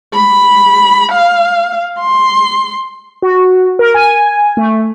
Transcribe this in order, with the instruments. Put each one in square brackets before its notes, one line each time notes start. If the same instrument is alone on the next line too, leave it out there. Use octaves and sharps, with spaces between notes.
[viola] B5
F5
C6
[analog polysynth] F#4
A#4
G#5
A3